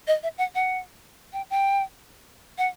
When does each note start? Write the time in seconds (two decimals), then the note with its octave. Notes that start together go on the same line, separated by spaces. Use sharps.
0.07 D#5
0.23 E5
0.38 F#5
0.55 F#5
1.33 G5
1.50 G5
2.58 F#5